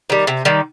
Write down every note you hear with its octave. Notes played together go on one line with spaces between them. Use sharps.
D#3 G3
C3
D#3 G3